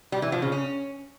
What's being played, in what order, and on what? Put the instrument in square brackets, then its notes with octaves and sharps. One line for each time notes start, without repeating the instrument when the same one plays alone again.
[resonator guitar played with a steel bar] G3
E3
F3
C#3
C#4